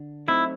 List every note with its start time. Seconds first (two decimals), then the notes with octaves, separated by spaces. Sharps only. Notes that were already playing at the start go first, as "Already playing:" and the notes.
Already playing: D3 D4
0.28 F#3 A3 C4 D#4 E4